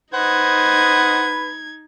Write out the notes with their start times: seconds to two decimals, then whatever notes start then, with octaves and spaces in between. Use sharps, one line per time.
0.14 D#4 B4 C5 D#5 F#5 G#6